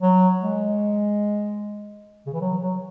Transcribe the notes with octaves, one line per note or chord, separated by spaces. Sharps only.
F#3
G#3
C#3
E3
F#3
F#3